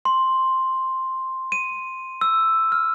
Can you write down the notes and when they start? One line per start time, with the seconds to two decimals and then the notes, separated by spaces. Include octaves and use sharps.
0.05 C6
1.52 D#7
2.21 E6
2.72 F6